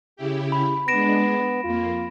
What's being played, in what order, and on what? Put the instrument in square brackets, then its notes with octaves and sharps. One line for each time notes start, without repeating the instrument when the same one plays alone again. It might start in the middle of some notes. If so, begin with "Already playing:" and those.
[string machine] C#3 E4 G4
[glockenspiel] B5
[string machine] G#3 D4 [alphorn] B3 [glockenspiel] A#6 D7 E7
[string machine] F2 A#3 [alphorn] F4